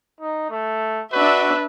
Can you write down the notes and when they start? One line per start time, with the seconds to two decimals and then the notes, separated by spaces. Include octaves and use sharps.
0.21 D#4
0.51 A3
1.13 D4 F#4 B4 E5